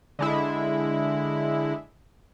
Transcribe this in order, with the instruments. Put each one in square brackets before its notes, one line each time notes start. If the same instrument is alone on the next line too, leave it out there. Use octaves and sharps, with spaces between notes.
[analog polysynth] D3 G#3 E4